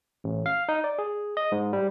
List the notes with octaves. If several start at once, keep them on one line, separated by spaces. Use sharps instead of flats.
A1
F5
D#4
D5
G#4
D#5
G#2
G3